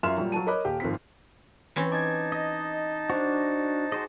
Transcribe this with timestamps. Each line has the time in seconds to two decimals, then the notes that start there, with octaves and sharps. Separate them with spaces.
0.03 F#2 F4 E5 C6 F6 E7
0.18 A#2 F#3 G3
0.32 F#3 F4 A5 D#7
0.47 A#4 C#5 D#5 B5 D6 F#6
0.64 D#1 G4 F5
0.80 G#1 F3 C4 B6
1.76 E3 C4 C#4
1.92 D#4 A5 D6 G#6
2.32 D#5
3.10 D4 F#4 C5
3.92 F#4 G#4 C5 D#5